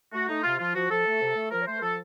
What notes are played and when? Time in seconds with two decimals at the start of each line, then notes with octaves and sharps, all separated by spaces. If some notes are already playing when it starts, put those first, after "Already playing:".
0.12 A3 F#4
0.28 A3 D#4
0.43 C3 F4
0.59 F3 F4
0.74 F3 F#4
0.89 F3 A4
1.05 A3
1.20 C3
1.35 A3
1.51 F3 A#4
1.61 C#5
1.66 A3 C5
1.77 A#4
1.82 F3 A4